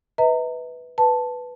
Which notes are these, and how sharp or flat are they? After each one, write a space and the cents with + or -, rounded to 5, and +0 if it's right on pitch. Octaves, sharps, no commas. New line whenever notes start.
B4 +0 E5 -45 A#5 -30
B4 +0 A5 +0